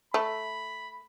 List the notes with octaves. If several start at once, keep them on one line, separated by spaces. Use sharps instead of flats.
A3 B5